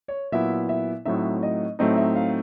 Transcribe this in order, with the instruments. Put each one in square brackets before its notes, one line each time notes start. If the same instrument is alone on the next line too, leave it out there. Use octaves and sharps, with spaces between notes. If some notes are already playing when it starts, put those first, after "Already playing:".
[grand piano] C#5
[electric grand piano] A#2 F#3 B3 E4 [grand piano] E5
[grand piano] E5
[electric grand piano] A2 F#3 A3 C4 D#4 [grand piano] E5
[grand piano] D#5
[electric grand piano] A2 F#3 A3 C4 D#4 [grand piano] D#5
[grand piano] E5
F5